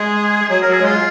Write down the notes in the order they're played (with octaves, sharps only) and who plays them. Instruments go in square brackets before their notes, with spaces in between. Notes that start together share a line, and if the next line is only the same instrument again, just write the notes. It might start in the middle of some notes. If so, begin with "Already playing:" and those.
Already playing: [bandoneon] G#3 [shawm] G#4
[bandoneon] F#3 [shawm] G#4
[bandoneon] F#3 [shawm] A#4
[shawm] G#4
[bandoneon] G#3 [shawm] F4